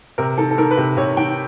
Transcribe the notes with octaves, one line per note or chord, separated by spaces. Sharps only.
C3 A#4
D#3 A4
A4
D#3 A#4
B4
C3
C3 C#5
D#3 G5